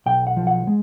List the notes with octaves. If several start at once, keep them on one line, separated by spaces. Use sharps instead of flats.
B1 G5
F#5
F3
F#5
G#3